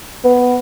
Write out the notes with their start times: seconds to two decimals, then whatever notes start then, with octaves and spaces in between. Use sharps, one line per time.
0.25 B3